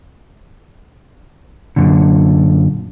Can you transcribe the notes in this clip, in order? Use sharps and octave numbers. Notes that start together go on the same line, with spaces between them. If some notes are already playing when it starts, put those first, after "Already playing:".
F#2 A#2 D3